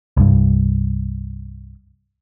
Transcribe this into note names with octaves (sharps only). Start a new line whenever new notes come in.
C2 G2